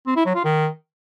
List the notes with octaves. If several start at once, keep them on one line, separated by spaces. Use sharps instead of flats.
C4
E4
F#3
F4
D#3